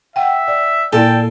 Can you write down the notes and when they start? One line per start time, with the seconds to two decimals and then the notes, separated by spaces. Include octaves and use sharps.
0.16 E5 F#5 G5
0.48 D5
0.93 A#2 E4 A4 D5 G5 G#5